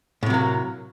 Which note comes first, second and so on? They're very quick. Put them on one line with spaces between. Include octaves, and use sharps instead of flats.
A2 C3 F#3 A#3